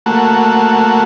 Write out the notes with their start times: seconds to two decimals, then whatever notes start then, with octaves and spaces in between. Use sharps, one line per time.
0.06 A3 A#3 F#4